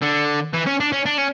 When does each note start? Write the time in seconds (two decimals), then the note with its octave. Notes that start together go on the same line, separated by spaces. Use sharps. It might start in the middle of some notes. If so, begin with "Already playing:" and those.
0.02 D3
0.54 E3
0.67 C#4
0.80 D4
0.92 C#4
1.06 D4
1.18 C#4